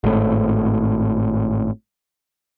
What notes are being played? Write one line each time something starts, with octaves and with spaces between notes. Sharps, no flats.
G#1 A2